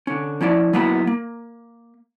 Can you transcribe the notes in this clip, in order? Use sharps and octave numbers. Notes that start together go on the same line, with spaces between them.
D3 C#4
F3 C#4 E4 D5
F#3 A#3 B3 E4 F5 B5
A#3